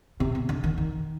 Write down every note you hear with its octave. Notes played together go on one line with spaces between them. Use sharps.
C3
C3
D3
D#3
D#3